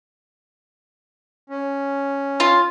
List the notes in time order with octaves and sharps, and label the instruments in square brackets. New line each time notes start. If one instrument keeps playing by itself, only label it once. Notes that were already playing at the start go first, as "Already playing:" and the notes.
[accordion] C#4
[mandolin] F4